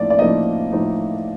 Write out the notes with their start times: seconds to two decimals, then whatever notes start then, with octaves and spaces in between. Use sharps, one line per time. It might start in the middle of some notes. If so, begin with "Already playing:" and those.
Already playing: A2 F3 A#3 D#4 D5
0.10 D5
0.19 A2 F3 A#3 D#4 D#5
0.72 A2 F3 A#3 D#4